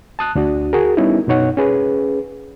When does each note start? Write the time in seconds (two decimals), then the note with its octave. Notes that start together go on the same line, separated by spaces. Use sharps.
0.19 A5 D#6 F#6
0.35 D2 D4 F#4
0.73 F#4 G#4 A#4
0.97 G3 B3 C#4 D#4 E4
1.27 F#2 B2 D#4 C#5 F#5
1.57 C#4 G#4 B4